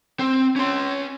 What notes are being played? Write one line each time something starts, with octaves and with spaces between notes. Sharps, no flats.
C4
C#4 C6